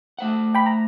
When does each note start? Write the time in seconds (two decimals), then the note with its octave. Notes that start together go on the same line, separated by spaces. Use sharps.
0.19 A3 C5 F#5
0.55 G5 B5
0.66 A#5